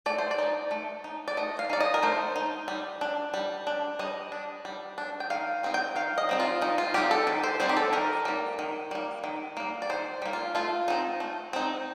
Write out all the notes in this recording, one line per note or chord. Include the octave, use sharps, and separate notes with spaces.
A3 D5
C5
D5
D#4
A3
D#4
D5
A3 D#5
F5
D#4 D5
D#5
A#4
A3 C5
D#4
G3
D4
G3
D4
G3 D#5
D4
G3
D4
G5
D#3 F5
G3 C4 D#4
G5
D#3 F5
D#5
G3 C4 D#4
F4
D#3 D#4
F4
G3 C4 D#4 G4
A4
D#3
C5
G3 C4 D#4 C5
G4
A4
D#3 A#4
G3 A#3
D#3
G3 A#3
D#3
G3 A#3
D5
D#3 C5
G3 A#3
F4
A3 F4
C4 D#4
A3
C4 D#4